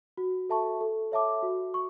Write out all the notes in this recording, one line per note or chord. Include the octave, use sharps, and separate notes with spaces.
F#4
A4 E5 A5 C#6
A4
C#5 E5 A5 D6
F#4
C#6